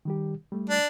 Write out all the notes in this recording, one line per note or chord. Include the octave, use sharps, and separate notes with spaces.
D#3 G3 G4
G3 A3
D4